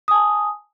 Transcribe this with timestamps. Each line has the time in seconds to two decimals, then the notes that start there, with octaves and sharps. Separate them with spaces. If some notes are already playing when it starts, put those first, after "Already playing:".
0.08 D#6
0.11 G#5
0.14 A5